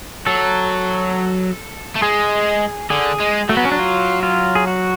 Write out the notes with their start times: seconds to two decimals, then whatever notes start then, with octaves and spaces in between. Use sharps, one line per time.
0.26 F#3 A4
1.96 A3
2.02 G#3 G#4
2.90 D3 G#4
3.20 G#3
3.49 F#3 A3
3.57 B3
3.65 C#4
3.72 D4
3.79 F4
4.23 F4
4.55 G#4
4.67 F#4